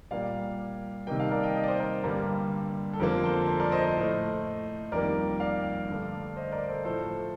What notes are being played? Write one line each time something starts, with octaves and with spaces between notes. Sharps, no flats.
A#2 G3 A#3 D5 F5
C3 D#3 G3 A#3 D#5 G5
F5 A5
A#4 D5
D#5 G5
D#5 G5
D5
C5 D#5
A#4 D5
G2 D3 G3 A#3
A4
F2 D3 F3 A#3 A#4
A#4
A4 C5
A4 C5
A#4 D5
C5 D#5
C5 D#5
A2 A3
F2 D#3 G3 A#3 A#4 D5
D5 F5
G2 D3 A3
C5 D#5
A#4 D5
A4 C5
A2 F3 A3 A4 C5